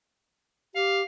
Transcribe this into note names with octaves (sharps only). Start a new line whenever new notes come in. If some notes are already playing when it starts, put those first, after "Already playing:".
G4 F5